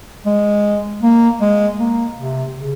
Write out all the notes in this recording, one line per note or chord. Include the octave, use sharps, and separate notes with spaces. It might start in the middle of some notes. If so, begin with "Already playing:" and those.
G#3
A#3
G#3
A#3
C3
C#3